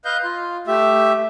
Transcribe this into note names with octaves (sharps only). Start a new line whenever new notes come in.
B4 D#5 F5 G6
F4
A3 G4 E5